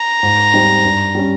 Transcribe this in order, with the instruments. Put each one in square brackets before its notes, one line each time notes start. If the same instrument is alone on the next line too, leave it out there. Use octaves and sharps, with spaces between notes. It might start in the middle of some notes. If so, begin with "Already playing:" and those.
Already playing: [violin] A#5
[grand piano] G#2
G3 C4 D#4
G2
G3 C#4